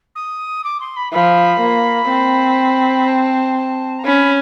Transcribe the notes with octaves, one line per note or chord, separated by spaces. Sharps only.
D#6
D6
C6
B5
F3 B5
A#3
C4
A5
A5
A#5
C#4 B5